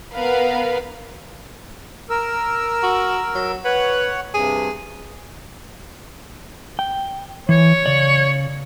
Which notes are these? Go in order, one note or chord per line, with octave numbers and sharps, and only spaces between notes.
B3 A#4 B4 F5
A#4 E6
F#4
F#3
B4 C#5 F#5
G2 C3 G#4
G5
E3 C#5
C#3 D5